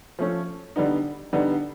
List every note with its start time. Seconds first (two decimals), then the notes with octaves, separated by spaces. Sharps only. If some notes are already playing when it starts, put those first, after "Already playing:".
0.19 F3 A3 C#4
0.76 D3 G3 B3 D#4
1.33 D3 G3 B3 D#4